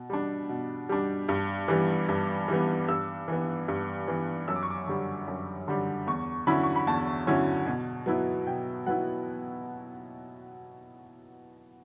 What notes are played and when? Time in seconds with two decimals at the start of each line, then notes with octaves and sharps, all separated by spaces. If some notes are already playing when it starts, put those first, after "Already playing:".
Already playing: B2
0.10 G3 D4
0.49 B2
0.89 G3 D4
1.29 G2
1.68 E3 G3 B3
2.09 G2
2.48 E3 G3 B3
2.89 G2 E6
3.28 E3 B3
3.68 G2
4.08 E3 B3
4.48 F#2 E6
4.56 D6
4.63 C#6
4.70 D6
4.87 D3 G3
5.28 F#2
5.68 D3 G3
6.07 E2 C#6
6.47 D3 F#3 C#4 E4 B5
6.63 C#6
6.76 B5
6.87 E2 A5
7.27 D3 F#3 C#4 E4
7.66 B2
8.06 F#3 B3 E4
8.47 B2 G5
8.86 F#3 B3 E4 F#5